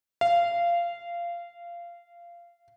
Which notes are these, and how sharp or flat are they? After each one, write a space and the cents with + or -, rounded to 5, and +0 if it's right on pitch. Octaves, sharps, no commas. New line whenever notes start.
F5 -20